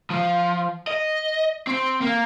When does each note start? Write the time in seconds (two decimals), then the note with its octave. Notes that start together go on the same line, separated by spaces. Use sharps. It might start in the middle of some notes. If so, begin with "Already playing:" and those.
0.10 F3
0.87 D#5
1.67 C4
2.01 A#3